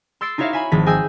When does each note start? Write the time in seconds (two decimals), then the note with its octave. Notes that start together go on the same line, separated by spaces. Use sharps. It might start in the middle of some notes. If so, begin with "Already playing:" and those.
0.21 C6 E6 A6 C7 D7
0.38 D#4 E4 F#4 C#5 E5 F5
0.53 E5 G#5 B5
0.72 G#1 F3 B6
0.86 G#4 D#5 G5 G#5 E6 G6